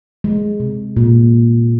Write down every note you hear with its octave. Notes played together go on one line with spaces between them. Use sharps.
G#3
C3
A#2